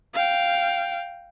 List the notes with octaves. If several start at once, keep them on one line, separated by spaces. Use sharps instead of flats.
F5 G5